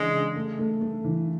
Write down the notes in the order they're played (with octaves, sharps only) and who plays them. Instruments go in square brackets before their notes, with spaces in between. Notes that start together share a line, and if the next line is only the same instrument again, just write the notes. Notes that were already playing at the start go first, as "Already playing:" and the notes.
Already playing: [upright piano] C#3 E3 D4 [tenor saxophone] G#3
[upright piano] C#3
A3
A3
A3
E3